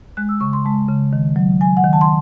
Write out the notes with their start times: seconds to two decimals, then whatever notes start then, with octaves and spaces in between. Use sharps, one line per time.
0.17 G#3 F#6
0.29 E6
0.40 C#3 C#6
0.53 C6
0.65 G#3 A5
0.89 C#3
1.13 D#3
1.36 F#3
1.61 F#3 G#5
1.77 F#5
1.84 D#3
1.93 A5
2.01 C6